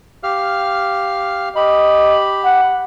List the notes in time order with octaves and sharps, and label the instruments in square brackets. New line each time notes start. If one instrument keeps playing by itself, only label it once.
[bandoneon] G4 F5 F6
[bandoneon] G4 B5 [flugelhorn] D#5
[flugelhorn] F#5